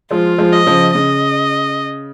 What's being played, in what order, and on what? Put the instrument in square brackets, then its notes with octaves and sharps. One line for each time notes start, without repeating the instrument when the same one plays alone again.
[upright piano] F3 G#3 [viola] F4
[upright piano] F3 G#3
[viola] D#5
[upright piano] C#3 F3
[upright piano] C#3 [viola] D#5